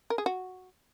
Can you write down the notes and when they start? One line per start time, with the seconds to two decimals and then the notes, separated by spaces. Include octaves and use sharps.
0.10 A#4
0.18 G#4
0.26 F#4